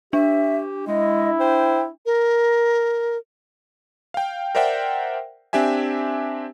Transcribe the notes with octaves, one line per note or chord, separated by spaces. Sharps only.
D4 G4 E5
G#3 E4 D#5
C5 G5
A#4
F5 G5
A#4 C5 D5 E5 F#5 G5
C4 D4 G4 E5 G#5